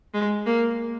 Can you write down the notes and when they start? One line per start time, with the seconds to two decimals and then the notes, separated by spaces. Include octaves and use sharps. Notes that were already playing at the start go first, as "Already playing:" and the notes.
0.14 G#3
0.46 A#3